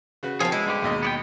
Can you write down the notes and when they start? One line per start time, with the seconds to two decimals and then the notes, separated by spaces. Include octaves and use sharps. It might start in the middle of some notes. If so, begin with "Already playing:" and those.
0.23 C#3 F#4 B4
0.40 F3 C4 G#4 F5
0.52 G#3 E4
0.66 G2 D3 G4 B5
0.82 D#2 B2 D#5
1.03 B3 D5 G5